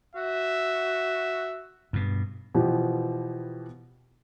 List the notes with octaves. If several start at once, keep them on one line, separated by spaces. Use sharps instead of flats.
F#4 E5
G2 B2
B2 E3 F3 G4